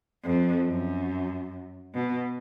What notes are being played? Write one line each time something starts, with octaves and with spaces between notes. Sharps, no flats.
F2
F#2
B2